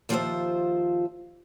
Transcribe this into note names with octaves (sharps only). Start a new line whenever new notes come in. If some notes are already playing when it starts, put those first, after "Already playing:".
D#2 F3 F4 A4 C5 E5